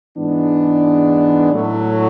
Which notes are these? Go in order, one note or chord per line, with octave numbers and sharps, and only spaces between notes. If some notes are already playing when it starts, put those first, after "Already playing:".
G#2 E3 G#3 B3 D4
A2 F#3 A3